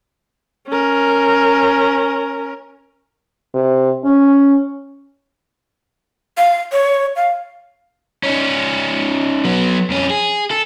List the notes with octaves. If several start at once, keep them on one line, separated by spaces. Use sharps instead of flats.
C#4 A#4
C3
C#4
F5
C#5
F5
C#4 D#4
F#3 B3
F2 C#4
G#4
A4